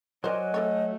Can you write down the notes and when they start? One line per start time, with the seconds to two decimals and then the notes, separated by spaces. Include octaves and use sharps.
0.24 F#3 F#4 A#4 C5 D5 D#5 G#5
0.54 E3 A3 A4 C#5